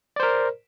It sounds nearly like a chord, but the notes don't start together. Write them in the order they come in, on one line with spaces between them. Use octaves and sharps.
D5 C5 A#4